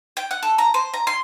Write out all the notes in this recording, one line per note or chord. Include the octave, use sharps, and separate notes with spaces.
G5
F#5
A4
A#5
C5
A#5
C6